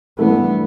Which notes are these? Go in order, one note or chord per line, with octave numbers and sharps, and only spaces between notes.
G2 E3 A3 B3